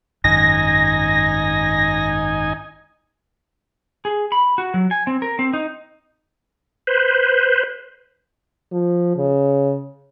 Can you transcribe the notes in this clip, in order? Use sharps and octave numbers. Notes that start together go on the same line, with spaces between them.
G#1 F#2 D#4 G#5 A#6
G#4
B5
F#4
F#3
G#5
C4
A#4
C4
D#4
B4 C5
F3
C#3